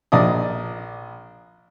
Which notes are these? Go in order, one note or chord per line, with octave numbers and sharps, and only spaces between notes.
A#1 D5 D#5 D#6